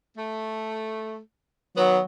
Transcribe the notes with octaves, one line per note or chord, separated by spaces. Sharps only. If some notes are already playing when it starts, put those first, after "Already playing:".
A3
D#3 F#3 B3